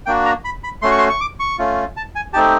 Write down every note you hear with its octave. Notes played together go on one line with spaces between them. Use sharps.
A#3 D4 F#4 G5
A#5
B5
B5
A3 C#4 F#4 C6
C#6
C6
C#6
D6
C#6
A3 C#4 F4
A5
G#5
A3 C4 D#4 G4 A5